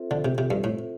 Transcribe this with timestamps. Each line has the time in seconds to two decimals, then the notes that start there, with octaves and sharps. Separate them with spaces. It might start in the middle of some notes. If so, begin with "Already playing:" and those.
Already playing: C4 F4 A4 C5 E5
0.11 D3
0.25 C3
0.38 C3
0.51 G2
0.64 A2